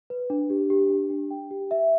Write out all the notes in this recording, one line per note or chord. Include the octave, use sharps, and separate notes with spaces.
B4
D4
G4
G4
D4
D4
G5
G4
E5